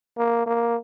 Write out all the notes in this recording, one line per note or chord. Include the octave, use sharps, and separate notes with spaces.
A#3
A#3